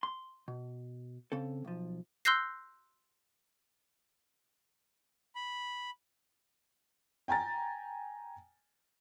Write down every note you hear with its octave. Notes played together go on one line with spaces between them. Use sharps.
C6
B2
C#3 C4 A4
B1 F3
C6 E6 F#6 G6 A#6 C7
B5
G5 G#5 A#5 A6